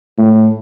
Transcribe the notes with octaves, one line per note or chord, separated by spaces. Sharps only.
A2